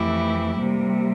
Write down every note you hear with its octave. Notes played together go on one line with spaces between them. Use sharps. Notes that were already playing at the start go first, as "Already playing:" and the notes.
Already playing: F2 E3 A3 E4 G4
C3 G3 A#3